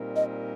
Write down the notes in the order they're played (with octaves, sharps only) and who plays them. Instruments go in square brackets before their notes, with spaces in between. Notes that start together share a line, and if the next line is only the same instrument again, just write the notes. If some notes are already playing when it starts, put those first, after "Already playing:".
Already playing: [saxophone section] A#2 G3 C4 D#4 A#4
[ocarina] D#5